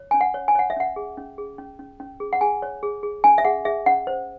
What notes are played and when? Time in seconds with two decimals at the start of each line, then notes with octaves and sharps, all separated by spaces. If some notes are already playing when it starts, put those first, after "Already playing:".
Already playing: C#5
0.11 C#4 G#5
0.21 F#5
0.34 C#5
0.48 G#5
0.55 C#5 F#5
0.70 E5
0.76 C#4 F#5
0.96 G#4
1.17 C#4
1.38 G#4
1.58 C#4
1.79 C#4
2.00 C#4
2.20 G#4
2.33 F#5
2.41 G#4 G#5
2.62 C#5
2.83 G#4
3.03 G#4
3.24 C#4 G#5
3.38 E5
3.45 G#4 F#5
3.65 G#4 E5
3.86 C#4 F#5
4.07 C5